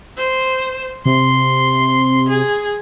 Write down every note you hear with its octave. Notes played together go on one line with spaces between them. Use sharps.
C5
C3 C6
G#4